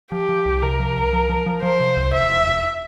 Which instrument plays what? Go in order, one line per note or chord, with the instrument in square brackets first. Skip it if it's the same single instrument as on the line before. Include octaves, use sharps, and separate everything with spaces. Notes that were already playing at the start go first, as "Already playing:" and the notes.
[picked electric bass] F3 [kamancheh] G4
[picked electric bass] F3
C2
[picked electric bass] C3 [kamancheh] A#4
[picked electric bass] F3
C2
F3
F3
F3
[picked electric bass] F3 [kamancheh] C5
[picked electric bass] C3
C2
[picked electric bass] E1 [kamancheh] E5
[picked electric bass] E1
E1